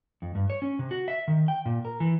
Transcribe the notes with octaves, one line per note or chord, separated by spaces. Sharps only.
F2
G2
C#5
C#4
C3
F#4
E5
D#3
G5
A#2
A#4
E3